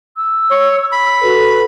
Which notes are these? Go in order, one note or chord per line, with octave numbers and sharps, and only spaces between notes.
E6
C#5
B5
F#4 A4 B4